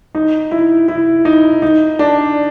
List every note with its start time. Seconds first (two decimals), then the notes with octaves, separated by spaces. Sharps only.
0.15 D#4
0.51 E4
0.88 E4
1.25 D#4
1.62 D#4
1.99 D4